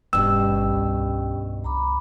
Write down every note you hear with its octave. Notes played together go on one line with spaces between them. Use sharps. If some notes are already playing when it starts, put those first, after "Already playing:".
D#1 G2 B2 C#4 G4 G5 E6
G#1
C2
C2 A#5 B5 D6